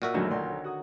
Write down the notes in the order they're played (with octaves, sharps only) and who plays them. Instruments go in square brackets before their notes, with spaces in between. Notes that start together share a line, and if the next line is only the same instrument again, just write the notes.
[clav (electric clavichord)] A#2 F#4 E5 [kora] A#4 D#5
[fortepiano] A#1 F#2 A2 [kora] D3 D#3 F#3
[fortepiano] B1 D5 C6
F#4 D#6